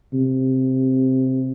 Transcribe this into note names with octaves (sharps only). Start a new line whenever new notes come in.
C3